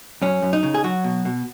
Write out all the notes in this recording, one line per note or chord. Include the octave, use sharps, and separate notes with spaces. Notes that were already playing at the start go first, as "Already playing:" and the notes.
F#2 C#4
F#2
D#4
C#3
G#4
F#3 F#4
B2
B2